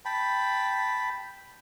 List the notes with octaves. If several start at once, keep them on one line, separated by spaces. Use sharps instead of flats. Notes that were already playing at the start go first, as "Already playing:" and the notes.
G5 A5 B5